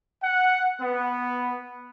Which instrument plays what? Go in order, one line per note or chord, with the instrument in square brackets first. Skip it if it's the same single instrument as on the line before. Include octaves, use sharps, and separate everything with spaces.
[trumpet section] F#5
B3